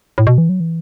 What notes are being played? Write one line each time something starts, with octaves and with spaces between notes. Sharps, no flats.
A2
B2
E3
F#3
E3